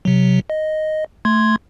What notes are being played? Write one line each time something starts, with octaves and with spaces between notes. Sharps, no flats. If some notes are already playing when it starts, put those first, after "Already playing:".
C3 F#3
D#5
A3 C6 G#6